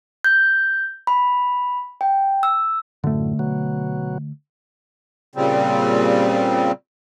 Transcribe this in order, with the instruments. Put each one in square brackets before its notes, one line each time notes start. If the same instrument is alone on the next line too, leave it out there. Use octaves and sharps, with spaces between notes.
[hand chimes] G6
B5
G5
E6
[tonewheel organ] F#2 A2 [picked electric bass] D3 A3
[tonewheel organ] B2 F#3
[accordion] A#2 C#3 G3 C4